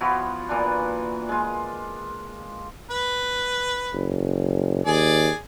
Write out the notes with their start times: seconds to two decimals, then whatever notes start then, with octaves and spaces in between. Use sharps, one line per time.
0.01 F3 B3 E4 F#4
0.49 A#2 E3 D4
1.29 G#3 F4
2.91 B4
3.94 F#1
4.86 D#2 G#4 D5 G#5